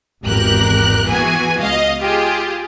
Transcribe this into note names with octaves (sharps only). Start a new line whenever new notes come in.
G#1 E2 G4 A#4 F#6
E3 B3 F#4 G#4 G#5
C#2 D#5 F5
F4 G4 G#4